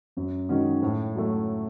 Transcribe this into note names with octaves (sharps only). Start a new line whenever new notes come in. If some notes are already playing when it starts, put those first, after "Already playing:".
F#2
D#3 G#3 C#4 F#4
A2
F#3 A3